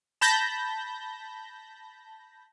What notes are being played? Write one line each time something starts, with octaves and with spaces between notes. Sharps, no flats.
A5 B5 G6 A#6